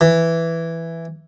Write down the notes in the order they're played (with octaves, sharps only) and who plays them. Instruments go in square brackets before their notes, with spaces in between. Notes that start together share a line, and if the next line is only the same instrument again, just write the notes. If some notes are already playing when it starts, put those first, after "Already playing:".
[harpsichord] E3